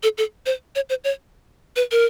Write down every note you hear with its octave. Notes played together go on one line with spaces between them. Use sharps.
A4
A4
C5
C#5
C5
C#5
B4
A#4